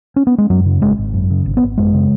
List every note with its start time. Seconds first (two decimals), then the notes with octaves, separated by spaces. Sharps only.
0.16 C#4
0.27 B3
0.38 G#3
0.50 F#2 F#3
0.65 C#3
0.82 G#1 G#3
0.98 G#1
1.14 F#2
1.30 C#3
1.46 G#1
1.57 B3
1.62 G#1
1.78 F#2 G#3
1.94 C#3